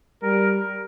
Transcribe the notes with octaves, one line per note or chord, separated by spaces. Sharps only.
G3 A#4